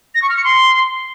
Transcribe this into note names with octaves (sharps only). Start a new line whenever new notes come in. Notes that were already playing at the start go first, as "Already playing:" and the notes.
A#6
C#6
F6
C#7
C6